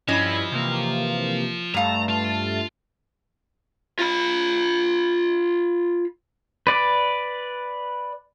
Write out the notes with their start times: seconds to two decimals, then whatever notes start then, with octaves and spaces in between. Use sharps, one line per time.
0.08 G2 F3 C#4 E4 C#5 D#5 B5
0.52 C3 E3 A#3
1.74 G2 G3 A3 F5 A5 A#5
2.09 F4
3.99 F4 B5
6.67 B4 D5